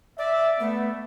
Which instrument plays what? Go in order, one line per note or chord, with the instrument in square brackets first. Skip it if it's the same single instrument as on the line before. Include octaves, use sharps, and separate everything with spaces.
[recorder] D5 [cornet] E5
[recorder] A3 [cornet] B3